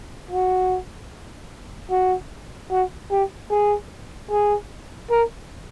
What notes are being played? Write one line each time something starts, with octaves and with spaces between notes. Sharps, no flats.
F#4
F#4
F#4
G4
G#4
G#4
A#4